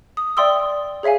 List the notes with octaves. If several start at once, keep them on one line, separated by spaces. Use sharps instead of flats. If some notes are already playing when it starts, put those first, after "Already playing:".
D#6
D5 E5 G5 C6 D#6 E6
G#4 C#5 E5 F5 G#5